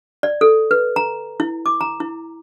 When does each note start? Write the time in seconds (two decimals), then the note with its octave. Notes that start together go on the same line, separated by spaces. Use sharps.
0.23 D5
0.41 A4
0.71 B4
0.96 A#5
1.40 E4
1.66 D6
1.81 A#5
2.00 E4